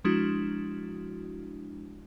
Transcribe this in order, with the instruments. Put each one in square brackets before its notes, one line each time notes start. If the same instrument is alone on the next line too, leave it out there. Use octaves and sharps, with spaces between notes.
[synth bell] F3 G#3 D4 E4 F#4